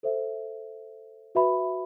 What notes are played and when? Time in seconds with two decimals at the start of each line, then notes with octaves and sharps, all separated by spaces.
0.03 A4 C5 E5
1.35 F#4 B4 E5 B5